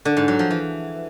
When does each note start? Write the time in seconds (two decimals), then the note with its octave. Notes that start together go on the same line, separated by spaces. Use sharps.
0.05 D3
0.17 G#2
0.28 F#3
0.39 F3
0.51 E3